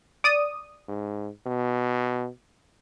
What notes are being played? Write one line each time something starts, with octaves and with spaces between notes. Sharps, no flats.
D5 D#6
G#2
B2